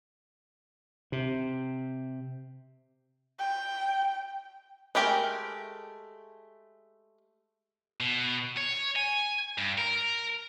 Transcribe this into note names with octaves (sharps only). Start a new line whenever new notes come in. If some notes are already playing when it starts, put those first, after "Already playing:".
C3
G5
G#3 A3 G4 A#4
B2
C#5
G#5
G2
A#4